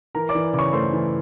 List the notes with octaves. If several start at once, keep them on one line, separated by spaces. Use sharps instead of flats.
E3 A#4 A#5
D5 D6
E3
C#3 C#5 C#6 D6
A3 C5 C6
E3